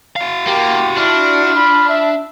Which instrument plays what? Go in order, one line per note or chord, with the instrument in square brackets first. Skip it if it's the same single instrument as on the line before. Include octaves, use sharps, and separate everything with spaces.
[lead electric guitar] F#4 F5
[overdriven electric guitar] A#3 [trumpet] G4
[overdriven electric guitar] D4 [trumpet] E4 [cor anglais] F4
[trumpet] B5
E5